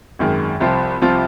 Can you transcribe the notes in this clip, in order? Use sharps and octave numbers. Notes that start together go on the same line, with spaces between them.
G#1 F#2 D#3 G#3
C2 C3 F3 C4 F4
C2 C3 F3 C4 F4